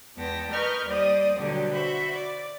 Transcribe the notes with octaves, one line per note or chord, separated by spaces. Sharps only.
E2 G#3 B3 G5 A5 A#6
A#4 B4 D#5 C#6 F6 G6
D#2 G3 C5 D5 D#5 D#6
B2 D3 F#3 G3 G4
F#4 C5 E5 B5
D5